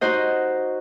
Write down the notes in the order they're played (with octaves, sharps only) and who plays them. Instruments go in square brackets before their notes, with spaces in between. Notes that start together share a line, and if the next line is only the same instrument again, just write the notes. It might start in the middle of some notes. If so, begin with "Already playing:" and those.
[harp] D#4 F#4 C5 D#5